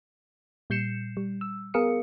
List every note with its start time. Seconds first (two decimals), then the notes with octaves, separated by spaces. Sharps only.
0.70 A#2 G3 G6 C7 C#7 E7
1.17 G3
1.41 E6
1.74 B3 G#4 A#4 F5 D#6 C#7